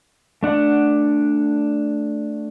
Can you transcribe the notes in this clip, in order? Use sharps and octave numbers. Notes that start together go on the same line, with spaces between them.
A3 D4 F#5